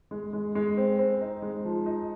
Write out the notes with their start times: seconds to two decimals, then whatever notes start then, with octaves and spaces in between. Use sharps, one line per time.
0.11 G#3
0.33 G#3
0.55 G#3
0.77 C4
0.99 C4
1.21 D#4
1.42 G#3
1.65 F3
1.86 D#4